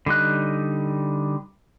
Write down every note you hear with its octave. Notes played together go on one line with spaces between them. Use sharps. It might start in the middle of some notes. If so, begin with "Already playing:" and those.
D3 G3 D#4 F#6